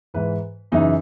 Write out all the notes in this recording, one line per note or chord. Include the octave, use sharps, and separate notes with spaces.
G#2 E3 B4
F#2 C#3 E3 D#4